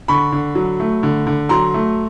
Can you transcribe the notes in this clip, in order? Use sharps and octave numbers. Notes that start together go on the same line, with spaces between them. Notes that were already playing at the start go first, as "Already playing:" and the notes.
D3 B5 C#6
D3
F#3
A3
D3
D3
F#3 A#5 C6
A3